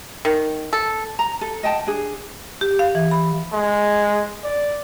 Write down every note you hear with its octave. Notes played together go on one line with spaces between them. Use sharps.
D#3
A4
A#5
A4
D#5 F#5 G5 A5
D4 G#4
G4
F5
E3
B5
G#3
D5